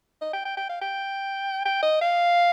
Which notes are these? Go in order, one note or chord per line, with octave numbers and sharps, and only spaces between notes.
D#5
G5
G5
G5
F5
G5
G5
D#5
F5